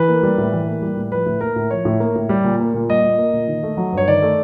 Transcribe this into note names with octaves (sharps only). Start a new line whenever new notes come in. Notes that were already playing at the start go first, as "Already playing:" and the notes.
Already playing: E3 B4
A#3
G3
A2
E3
A#3
G3
A2
F3 B4
A2
A#3 A#4
A2
F3 C#5
A2
A#3
A2
G3
A#2
A#3
A#2
G3 D#5
A#2
A#3
A#2
D#3
A3
F#3
G2
C#5
D#3 D5
A3